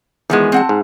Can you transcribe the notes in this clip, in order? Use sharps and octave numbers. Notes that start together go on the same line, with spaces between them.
E2 D#3 F3 G#3 B3
C4 F#5 A5
G#2